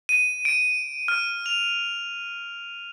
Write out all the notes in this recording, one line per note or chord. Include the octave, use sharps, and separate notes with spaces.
D#7
D7
F6
F7